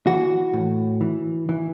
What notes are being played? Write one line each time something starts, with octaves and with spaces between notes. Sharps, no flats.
E3 F#4
A2
E3
E3